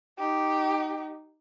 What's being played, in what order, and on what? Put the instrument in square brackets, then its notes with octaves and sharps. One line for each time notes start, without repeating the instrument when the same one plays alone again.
[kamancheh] D#4 [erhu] G4